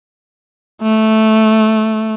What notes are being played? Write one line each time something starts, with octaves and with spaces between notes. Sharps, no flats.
A3